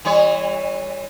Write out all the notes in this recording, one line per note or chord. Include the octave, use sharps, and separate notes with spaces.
E3 G3 C#5